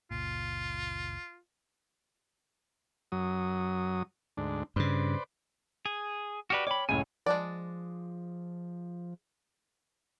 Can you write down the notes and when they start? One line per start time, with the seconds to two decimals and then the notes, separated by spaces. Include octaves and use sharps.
0.11 F#1 C#2 A#2 F4
3.12 F#2 F#3 D#6
4.37 D2 G#2 D4
4.76 G2 C#3 B4 C5 D5
5.86 G#4
6.50 F#4 G4 B4 D5 F6
6.67 C#5 G5 B5 D6
6.89 C#2 F#2 A2 C#5 G#5
7.26 F3 G#3 D4 D5